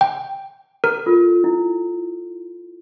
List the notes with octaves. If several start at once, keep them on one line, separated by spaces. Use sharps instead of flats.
G5
A#4
F4 A4
E4